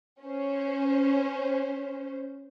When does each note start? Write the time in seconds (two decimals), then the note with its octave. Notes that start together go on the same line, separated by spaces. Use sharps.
0.22 C#4 C5